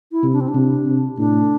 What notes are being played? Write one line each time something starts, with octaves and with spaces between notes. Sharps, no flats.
E4
C3
D4
C4
D4
C3
C3
A2 D4